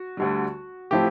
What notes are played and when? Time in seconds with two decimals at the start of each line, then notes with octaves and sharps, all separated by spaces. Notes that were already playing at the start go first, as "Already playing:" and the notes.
Already playing: F#4
0.17 D2 D3 G3
0.91 A2 F3 A3 C4 E4 G4